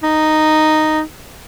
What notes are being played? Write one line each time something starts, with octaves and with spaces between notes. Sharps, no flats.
D#4